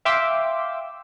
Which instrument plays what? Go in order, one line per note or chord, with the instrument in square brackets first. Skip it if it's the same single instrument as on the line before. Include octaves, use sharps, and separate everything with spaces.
[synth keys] E5 F5 G5 C6 D6 E6